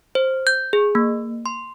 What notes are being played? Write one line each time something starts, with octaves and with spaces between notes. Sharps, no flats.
C5
G6
G#4
A#3
C6